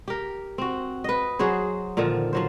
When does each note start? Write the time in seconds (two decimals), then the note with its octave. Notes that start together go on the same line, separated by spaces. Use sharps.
0.08 G4 A#4
0.58 C4 F#4
1.04 B4 D#5
1.39 F#3 F#4 G#4 C5
1.97 A#2 D3 D#3 F3
2.33 F3 F#3 C5